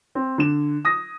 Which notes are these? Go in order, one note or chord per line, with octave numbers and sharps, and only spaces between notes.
C4
D3 E7
D#6 A#6